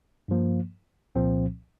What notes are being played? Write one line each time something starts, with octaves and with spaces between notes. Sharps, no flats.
G2 F3 A#3
C2 A#2 F3 C4